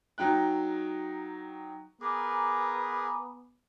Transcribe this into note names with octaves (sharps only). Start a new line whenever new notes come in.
F#3 D#4 G5 F#6
B3 G#4 A#4 B4 G#5 A#5 D6